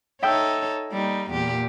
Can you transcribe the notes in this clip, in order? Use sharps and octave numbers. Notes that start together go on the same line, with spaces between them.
D#4 A4 C#5 E5 G5 E6
G3 A#3 D#4
E2 A#2 G4